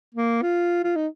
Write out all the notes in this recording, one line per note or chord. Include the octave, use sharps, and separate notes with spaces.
A#3
F4
F4
D#4